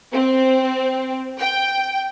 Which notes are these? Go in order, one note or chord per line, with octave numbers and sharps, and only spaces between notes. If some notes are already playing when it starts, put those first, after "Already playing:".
C4
G5